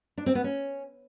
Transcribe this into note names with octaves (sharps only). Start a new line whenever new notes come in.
D4
C4
B3
C#4